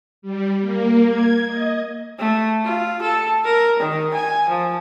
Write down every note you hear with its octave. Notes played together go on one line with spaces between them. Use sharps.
G3
A#3
G#6
D#5
A3
F4
A4
A#4
D#3
G#5
F3